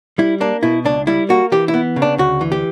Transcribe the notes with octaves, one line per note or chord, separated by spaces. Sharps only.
G3 E4
A#3 D4
B2 E4
C#2 D4
G3 E4
A#3 F#4
E3 G4
E4
B3
C#3
D4
D2 F#4
E3
G4